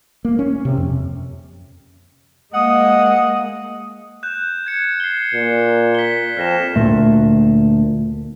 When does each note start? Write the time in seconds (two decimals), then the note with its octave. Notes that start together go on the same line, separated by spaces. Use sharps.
0.25 A#3
0.39 C#4
0.65 C3
0.77 F2
2.54 G#3 A#3 D#5 F#5 D#6
4.23 F#6 G6 E7
4.66 G#6 C#7
5.00 C7 G7
5.34 A#2
5.95 B6 G7
6.37 F2 F6 A#6 E7
6.76 D2 A#2 A3